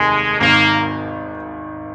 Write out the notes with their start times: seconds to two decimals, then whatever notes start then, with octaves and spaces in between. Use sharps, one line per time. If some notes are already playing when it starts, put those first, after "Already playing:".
Already playing: F1 D#2 D#3 G#3
0.40 G#1 G#2 D#3 A#3